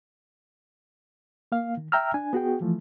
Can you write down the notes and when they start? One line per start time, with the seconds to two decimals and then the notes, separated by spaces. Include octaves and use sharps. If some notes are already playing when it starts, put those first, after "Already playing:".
1.52 A#3 F5
1.77 D#3
1.92 E5 G5 A#5 E6 F6
2.14 D4 G#5
2.33 B3 F#4 G#4 G5
2.61 E3 F3 A3